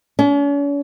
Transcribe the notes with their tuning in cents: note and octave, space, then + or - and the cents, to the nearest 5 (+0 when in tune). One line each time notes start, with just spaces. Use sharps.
C#4 +45